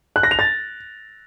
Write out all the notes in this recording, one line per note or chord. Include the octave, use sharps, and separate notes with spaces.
F#6
A#6
F7
A6